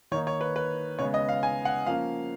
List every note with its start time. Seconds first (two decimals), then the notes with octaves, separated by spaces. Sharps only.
0.11 D#3 A#3 D#4 C#5
0.27 C#5
0.41 B4
0.56 B4
0.99 C#3 G#3 B3 C#5
1.14 D#5
1.29 F5
1.43 G#5
1.65 F#5
1.86 F3 A#3 C#4 F5